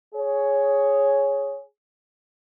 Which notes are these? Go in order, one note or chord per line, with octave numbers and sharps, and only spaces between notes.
G#4 C#5